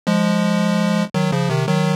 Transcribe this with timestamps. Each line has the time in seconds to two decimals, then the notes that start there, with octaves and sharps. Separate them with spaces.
0.07 F3 G#3
1.14 D#3 F#3
1.32 C#3 F3
1.50 C3 D#3
1.68 D#3 F#3